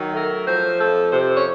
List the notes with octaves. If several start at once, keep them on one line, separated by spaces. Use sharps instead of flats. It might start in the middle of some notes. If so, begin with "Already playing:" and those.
Already playing: D#3 F#3
A3 A#4
F3 C5
F2 A4
C3 C5
C#5